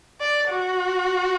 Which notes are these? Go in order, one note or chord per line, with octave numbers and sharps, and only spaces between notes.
D5
F#4